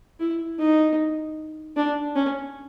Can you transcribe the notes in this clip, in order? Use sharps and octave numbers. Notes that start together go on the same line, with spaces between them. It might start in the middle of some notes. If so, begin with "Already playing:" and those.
E4
D#4
D4
C#4